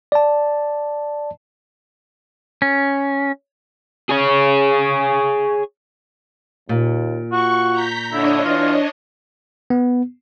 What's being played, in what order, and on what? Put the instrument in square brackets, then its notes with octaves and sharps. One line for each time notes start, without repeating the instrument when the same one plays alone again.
[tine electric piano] D5 A5
[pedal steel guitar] C#4
[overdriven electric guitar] G#4 C#5
[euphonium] D#2 [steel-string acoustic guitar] A#2
[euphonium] F4 [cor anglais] F#4 [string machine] C#6
[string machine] A#5 G6 B6
[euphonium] D3 [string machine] D4 C#5 D#5 [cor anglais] E4
[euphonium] E3 [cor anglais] F4
[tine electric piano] B3